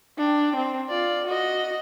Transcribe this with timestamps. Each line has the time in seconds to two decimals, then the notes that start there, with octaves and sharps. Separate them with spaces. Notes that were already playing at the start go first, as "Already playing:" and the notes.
0.18 D4 G5
0.56 C4
0.89 F4 D5
1.26 F#4 D#5